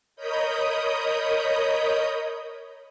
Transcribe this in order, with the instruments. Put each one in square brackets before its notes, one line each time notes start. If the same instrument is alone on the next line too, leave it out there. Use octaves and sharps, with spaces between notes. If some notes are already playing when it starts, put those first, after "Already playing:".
[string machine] A#4 C#5 D#5 B5 D#6 G6